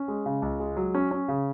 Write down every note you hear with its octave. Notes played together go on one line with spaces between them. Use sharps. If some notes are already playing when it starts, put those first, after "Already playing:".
Already playing: C#4
G#3
C#3
C#2
G#3
F#3
C#4
C#4
C#3